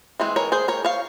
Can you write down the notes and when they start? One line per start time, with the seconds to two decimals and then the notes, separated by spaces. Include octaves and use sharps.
0.20 E3 G#3 C4
0.36 A#4 C#5
0.52 G#4 C5
0.68 A#4 C#5
0.85 C#5 F5